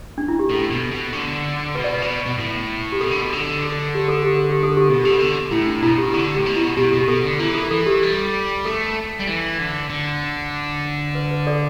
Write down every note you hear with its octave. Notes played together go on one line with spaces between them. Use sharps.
D4
E4
G4
A2 A4
B2
B2
D3
B2 B4
D5
B4
D3
B2
B2
A2
G4
B2 A4
D3
B2 A4
D3 A4
A4
G4
A4
G4
A4
G4
A4
G4
B2 A4
D3 G4
B2
D3
A2 E4
D4
B2 E4
G4
D3 E4
A2 G4
B2
E4
B2 G4
B2
G4
B2 A4
D3
E3 E4
A4
E3 A4
G4
G3
A3 A4
G3
E3
D3
D3
B4
B4
A4 D5